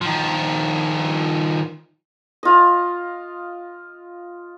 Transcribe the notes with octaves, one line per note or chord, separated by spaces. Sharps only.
D#3 F3
F4 D#5